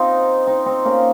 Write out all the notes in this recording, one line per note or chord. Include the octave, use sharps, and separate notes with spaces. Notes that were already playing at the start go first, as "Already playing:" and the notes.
Already playing: C4 D#4 F4
C4 D#4
C4 D#4
A#3 C#4